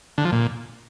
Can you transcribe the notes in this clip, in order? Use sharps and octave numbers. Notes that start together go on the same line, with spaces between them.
D3
F3
A#2